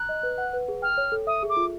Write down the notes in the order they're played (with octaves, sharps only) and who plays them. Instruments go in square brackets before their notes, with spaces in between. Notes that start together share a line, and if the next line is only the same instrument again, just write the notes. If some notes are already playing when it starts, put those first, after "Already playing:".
Already playing: [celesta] A#5 [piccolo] F#6
[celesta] D#5
B4
F#5
B4
G#4
[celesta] G5 [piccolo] F6
[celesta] C#5
A4
[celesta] E5 [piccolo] D#6
[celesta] G#4
[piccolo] D6
[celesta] F4